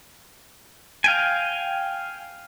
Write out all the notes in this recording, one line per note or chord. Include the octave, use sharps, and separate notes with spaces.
F5 G5 G#5